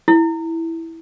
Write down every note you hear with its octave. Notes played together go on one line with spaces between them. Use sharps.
E4